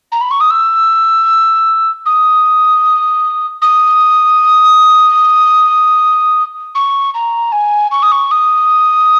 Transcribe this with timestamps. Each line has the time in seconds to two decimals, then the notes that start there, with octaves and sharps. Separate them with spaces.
0.12 A#5
0.21 B5
0.31 C#6
0.40 D#6
0.50 E6
2.06 D#6
3.62 D#6
6.75 C#6
7.14 A#5
7.52 G#5
7.91 C#6
8.02 D#6
8.12 C#6
8.31 D#6